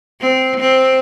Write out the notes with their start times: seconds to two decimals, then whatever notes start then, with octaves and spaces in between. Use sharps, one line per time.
0.21 C4
0.60 C4